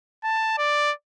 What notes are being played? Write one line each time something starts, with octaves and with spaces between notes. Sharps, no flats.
A5
D5